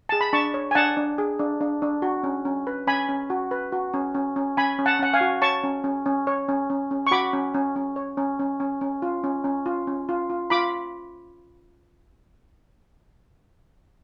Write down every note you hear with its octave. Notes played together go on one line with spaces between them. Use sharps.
G#4 A5
B5
D4 A5 C#6
C#5
G#5
D4 F#5 A5
D4
G#4
D4
D4
D4
F#4
C#4
C#4
B4
C#4 G#5 B5
C#4
F#4
B4
F#4
C#4
C#4
C#4
C#4 G#5 B5
C#4
F#5 A5
C#4 F#5
F5 G#5
F#4
C#5 A5 C#6
C#4
C#4
C#4
C#5
C#4
C#4
C#4
C#6
F#4 B5 D6
C#4
C#4
C#4
C#5
C#4
C#4
C#4
C#4
F4
C#4
C#4
F4
C#4
F4
F4
F4 B5 D6